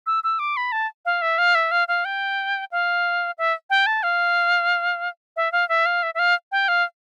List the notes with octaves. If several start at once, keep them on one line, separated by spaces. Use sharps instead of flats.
E6
E6
D6
B5
A5
F5
E5
F5
E5
F5
F5
G5
F5
E5
G5
A5
F5
E5
F5
E5
F5
E5
E5
F5
G5
F5